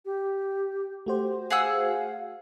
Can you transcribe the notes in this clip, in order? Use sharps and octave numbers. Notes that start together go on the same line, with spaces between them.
G4
A3 F#4 G4 C5
G#4 F5 F#5 E6